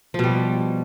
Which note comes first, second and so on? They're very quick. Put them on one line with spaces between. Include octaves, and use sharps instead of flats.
F3 B2 G3